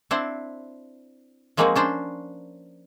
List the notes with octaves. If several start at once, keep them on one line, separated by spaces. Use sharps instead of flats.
C4 D4 E4 C5 F#5
F3 G#3 A#3 C4 D#4 F#4
C#4 D4 C5 G5